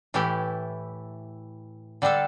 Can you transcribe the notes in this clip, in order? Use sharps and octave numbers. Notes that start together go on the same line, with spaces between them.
A2 E3 A3 E4 G4
D3 G3 D4 A4